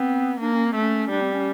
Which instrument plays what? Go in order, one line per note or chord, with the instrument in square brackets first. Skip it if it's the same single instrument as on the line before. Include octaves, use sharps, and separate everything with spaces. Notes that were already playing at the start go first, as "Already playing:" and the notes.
Already playing: [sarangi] B3 [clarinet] C4
[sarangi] A#3 [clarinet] D4
[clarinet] C#4
C4
[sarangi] A3
[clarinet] C#4
[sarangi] G3 [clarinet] D4
[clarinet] C4
C#4